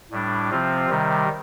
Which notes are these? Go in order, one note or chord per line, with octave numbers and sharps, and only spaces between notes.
A2 G3 D4
C3 F3 C4 F4
C3 D#3 G3